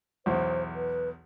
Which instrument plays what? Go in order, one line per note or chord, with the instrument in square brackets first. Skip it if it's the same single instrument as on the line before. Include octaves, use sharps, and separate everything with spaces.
[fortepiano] B1 E2 [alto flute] C5
[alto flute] B4